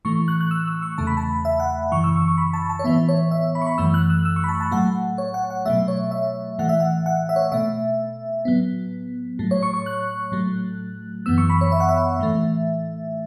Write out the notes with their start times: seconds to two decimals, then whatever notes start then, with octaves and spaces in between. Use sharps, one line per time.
0.05 A2 E3 A3 C#6
0.28 F#6
0.41 F#6
0.51 E6
0.67 E6
0.82 C#6
0.98 E2 C#3 A3 A5
1.07 B5
1.17 A5
1.45 E5
1.60 F#5
1.92 F#2 C#3 E3 C#6
2.04 E6
2.16 C#6
2.28 C#6
2.38 B5
2.53 A5
2.69 A5
2.79 C#5
2.84 A2 E3 B3 E5
3.09 C#5
3.31 E5
3.55 B5
3.62 C#6
3.67 B5
3.78 F#2 E3 A3 E6
3.94 F#6
4.10 E6
4.25 E6
4.36 C#6
4.44 B5
4.49 A5
4.60 A5
4.71 A2 F#3 A3 F#5
5.18 C#5
5.34 F#5
5.50 F#5
5.66 B2 F#3 A3 E5
5.88 C#5
6.11 E5
6.58 A2 E3 A3 F#5
6.69 E5
6.80 F#5
7.06 F#5
7.29 E5
7.36 C#5
7.52 B2 A3 E5
8.45 A2 F#3 B3
9.39 A2 F#3 A3
9.51 C#5
9.63 C#6
9.74 C#6
9.86 F#6
10.32 A2 F#3 A3
11.26 F#2 E3 B3 E6
11.38 C#6
11.50 B5
11.61 C#5
11.72 E5
11.80 F#5
11.89 E5
12.19 A2 E3 A3